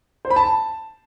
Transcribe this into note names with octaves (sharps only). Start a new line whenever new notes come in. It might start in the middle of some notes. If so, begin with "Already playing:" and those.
C5
B5
A5